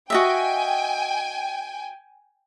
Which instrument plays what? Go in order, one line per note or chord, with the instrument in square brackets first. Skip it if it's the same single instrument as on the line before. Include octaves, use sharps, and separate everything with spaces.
[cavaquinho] F#4 D#5 E5 [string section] G5 G#5